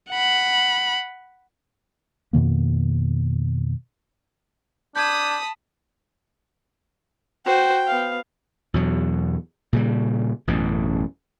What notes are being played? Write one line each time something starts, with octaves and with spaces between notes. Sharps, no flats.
F#5 B5
F2 B2 D#3 A#3
D4 A5 B5 D#6 G6 G#6
F#4 C5 G5
B3 F5
E2 B2 F#3
A#2 C#3 G3
A1 F#2 B2